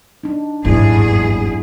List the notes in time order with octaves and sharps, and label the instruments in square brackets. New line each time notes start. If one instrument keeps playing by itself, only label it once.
[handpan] D4 D#4
[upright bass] G#1 A#2 [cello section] E2 G2 G#4 [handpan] F#3 B3 E4